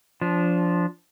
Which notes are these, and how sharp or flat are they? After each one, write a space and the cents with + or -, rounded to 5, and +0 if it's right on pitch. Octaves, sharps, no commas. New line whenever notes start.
F3 +0 D4 -20